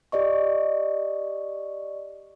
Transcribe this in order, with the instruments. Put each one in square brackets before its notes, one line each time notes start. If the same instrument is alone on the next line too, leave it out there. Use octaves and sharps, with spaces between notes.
[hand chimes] G4 D5 D#5 C#6